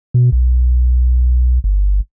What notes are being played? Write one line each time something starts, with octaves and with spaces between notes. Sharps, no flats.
B2
B1
G1